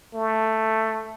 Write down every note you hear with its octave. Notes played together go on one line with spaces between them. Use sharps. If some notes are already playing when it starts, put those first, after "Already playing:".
A3